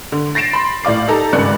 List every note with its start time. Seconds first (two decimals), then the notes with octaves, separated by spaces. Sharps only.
0.12 D3
0.35 A6 A#6 C7 D7 E7
0.53 B5 C6
0.83 A2 D5 F5 D6 C7
1.07 D#4 G4 A4 A#5
1.33 G#1 G2 C#3 D5 F#6 C#7